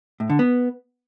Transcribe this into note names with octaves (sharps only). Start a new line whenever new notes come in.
A2
D3
B3